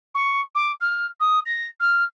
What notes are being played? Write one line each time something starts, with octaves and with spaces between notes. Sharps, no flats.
C#6
D6
F6
D#6
A#6
F6